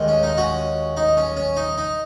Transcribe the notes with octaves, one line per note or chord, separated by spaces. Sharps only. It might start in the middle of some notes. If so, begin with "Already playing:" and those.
Already playing: D#2 D#3 G#3
C#4
D#4
C#4 F#4
D#4
C#4
C#4
D#4
D#4